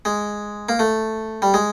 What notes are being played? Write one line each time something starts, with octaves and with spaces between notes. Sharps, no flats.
G#3
A#3
A3
G3
G#3